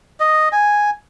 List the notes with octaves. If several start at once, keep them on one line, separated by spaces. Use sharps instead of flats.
D#5
G#5